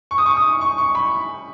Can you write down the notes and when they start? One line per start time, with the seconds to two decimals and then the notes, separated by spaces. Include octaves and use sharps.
0.11 C#6
0.18 D#6
0.26 C#6
0.37 D#6
0.61 C#6
0.78 C#6
0.95 B5